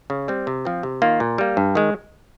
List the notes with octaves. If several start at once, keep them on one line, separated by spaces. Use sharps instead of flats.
C#3
G3 C4
C3
F3 C4
C3
D#3 A#3 F4
A#2
G3 A#3
G2
D#3 G#3